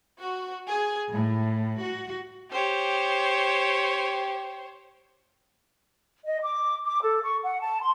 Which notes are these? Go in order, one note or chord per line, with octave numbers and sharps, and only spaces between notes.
F#4
G#4
A2
F#4
G4 C5 C#5
D#5
D6
D6
A4
C#6
F#5
A5
C6